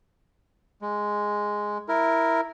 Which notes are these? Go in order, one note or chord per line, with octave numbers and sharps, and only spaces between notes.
G#3
E4 A#4